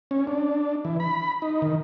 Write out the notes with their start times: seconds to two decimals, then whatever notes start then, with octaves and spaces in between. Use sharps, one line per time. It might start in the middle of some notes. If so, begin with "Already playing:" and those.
0.11 C#4
0.27 D4
0.85 E3
1.00 B5
1.42 D#4
1.62 D#3